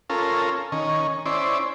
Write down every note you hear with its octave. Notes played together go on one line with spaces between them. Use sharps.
C#4 F4 A4 A#4
D#3 C#4
C#4 E4 C5 D5